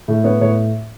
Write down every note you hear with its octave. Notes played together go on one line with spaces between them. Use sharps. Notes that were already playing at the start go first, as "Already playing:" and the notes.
A2
B3 C#5
A2 C#5